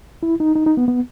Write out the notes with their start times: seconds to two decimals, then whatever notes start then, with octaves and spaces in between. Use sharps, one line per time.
0.23 E4
0.40 D#4
0.55 D#4
0.66 D#4
0.77 B3
0.88 B3